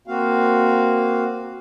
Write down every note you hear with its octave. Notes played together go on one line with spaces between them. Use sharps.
A#3 C4 F#4 F5